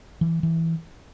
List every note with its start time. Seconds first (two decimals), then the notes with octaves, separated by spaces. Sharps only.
0.21 E3
0.43 E3